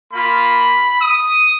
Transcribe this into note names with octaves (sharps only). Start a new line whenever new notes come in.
A#3 F4 B5
D#6